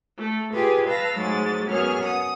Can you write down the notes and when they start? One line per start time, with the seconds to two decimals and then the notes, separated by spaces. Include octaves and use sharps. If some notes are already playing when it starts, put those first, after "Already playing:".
0.17 A3 A4
0.53 F4 G4 G#4 B4
0.86 B4 F5 A5 E6 A#6
1.16 G#2 F#3 G#3 A3 A6
1.69 F#2 B3 C#4 G#4 F6
2.02 F#5 D#6